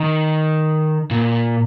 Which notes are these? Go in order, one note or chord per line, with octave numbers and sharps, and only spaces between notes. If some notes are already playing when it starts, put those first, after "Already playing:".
Already playing: D#3
A#2